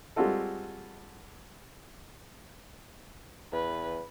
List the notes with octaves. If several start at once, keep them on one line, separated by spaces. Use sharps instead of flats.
G3 G#3 C4 F4 F#4 A4
E2 B4